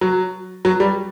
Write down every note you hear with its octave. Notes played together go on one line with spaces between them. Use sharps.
F#3
F#3
G3